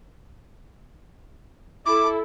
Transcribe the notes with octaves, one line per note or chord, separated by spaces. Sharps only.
E4 A4 D6